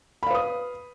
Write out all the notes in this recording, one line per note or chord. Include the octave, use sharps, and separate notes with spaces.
B4 F5 B5 D#6